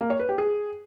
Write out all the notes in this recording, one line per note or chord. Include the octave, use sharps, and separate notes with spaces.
A#3
C#5
B4
G4
G#4